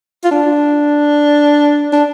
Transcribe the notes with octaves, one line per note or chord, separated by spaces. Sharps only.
F4
D4
D4